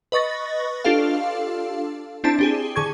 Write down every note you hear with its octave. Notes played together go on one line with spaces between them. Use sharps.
B4 D#5 C#6 A6 A#6
D4 F4 G4 A4 F5
C4 D4 E4 A5
D4 G4 G#4
D3 G#4 C#6 G#6